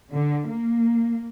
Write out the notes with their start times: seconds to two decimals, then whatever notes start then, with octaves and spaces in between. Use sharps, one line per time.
0.11 D3
0.48 A#3